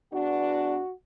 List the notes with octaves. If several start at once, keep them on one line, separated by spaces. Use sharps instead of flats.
E2 B3 D4 F#4